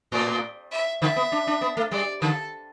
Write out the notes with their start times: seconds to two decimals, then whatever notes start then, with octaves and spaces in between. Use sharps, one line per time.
0.12 A2 D5
0.71 E5
1.02 D3 E5
1.16 B3
1.32 D4
1.47 D4
1.61 B3
1.77 A3
1.91 G3 D5
2.22 D3 A4